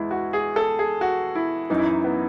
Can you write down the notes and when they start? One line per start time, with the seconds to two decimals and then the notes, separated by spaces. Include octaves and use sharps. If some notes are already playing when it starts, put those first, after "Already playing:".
Already playing: E2 G#3 E4
0.11 F#4
0.33 G#4
0.56 A4
0.79 G#4
1.01 F#4
1.35 E4
1.70 F#2 E3 D#4
1.78 E4
1.86 D#4
2.04 B3